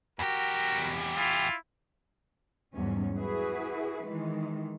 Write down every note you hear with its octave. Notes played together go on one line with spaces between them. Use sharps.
E2 F#4 G4 A#4
E4 F4
E2 G#2 F#3 G3 C#4
E4 F#4 G#4 B4
D#3 E3 G#3